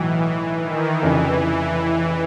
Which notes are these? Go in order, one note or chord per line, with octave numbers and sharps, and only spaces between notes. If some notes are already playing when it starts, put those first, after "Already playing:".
Already playing: B1 A2 E3 F#3
D#3
F1 F2 C#3 E3
E3
E3